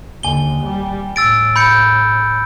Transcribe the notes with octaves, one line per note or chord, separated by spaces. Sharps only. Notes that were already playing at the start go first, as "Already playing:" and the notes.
D#2 D3 G#5 G7
G3
A2 E6 A6 D7
B5 G6 C#7